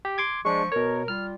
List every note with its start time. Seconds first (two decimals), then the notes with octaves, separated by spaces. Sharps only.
0.05 G4
0.18 C6 D6 G#6
0.45 F3 G#3 D4 C#6
0.72 B2 A#4 C#5
1.08 G3 F4 F6